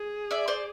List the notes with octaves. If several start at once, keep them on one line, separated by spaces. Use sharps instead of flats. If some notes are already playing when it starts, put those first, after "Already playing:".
Already playing: G#4
D5 E5
C5 D5